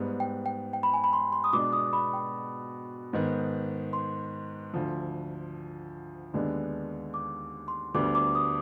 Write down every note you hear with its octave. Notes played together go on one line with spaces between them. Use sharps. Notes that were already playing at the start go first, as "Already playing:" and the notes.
Already playing: G#2 G3 B3
G5
G5
G5
B5
G#5
B5
C6
C6
D#6
B2 G#3 B3 D4 D6
D#6
B5
G5
G#2 D#3 B3
C6
D2 D3 F3
D#2 D3 G#3 B3 D4
D6
C6
D2 D3 G3 B3 D4 D6
D6
D#6